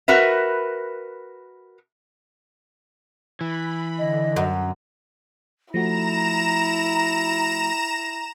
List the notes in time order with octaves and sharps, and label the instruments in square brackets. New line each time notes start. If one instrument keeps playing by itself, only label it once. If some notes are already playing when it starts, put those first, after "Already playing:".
[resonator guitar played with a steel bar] F#4 A#4 B4 E5
[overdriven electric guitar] E3 [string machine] B5
[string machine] D3 [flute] D#5
[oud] F#2
[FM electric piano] F3 A3 F#4 [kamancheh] E4 [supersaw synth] A#5 E7 [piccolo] A#6